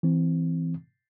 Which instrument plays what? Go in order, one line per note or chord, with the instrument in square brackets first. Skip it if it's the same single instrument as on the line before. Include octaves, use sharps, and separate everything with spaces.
[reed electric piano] E3 C4